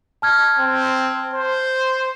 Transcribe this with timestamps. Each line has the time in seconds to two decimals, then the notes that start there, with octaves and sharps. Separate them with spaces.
0.22 A5 F6 G#6
0.59 C4
1.34 C5